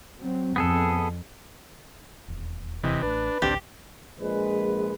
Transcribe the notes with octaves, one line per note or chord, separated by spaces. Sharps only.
F#3 C4
F2 B3 G#4 A4
D#1 E2
C3 E3 D#5
A1 A3 D4 B4
A1 D2 C4 D4 G4
A#1 G#3 B4